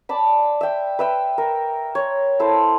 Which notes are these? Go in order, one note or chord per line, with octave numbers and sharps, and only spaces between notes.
D5 A5 B5
E5 G5
B4 E5 G5
A#4
C#5
E4 A4 C5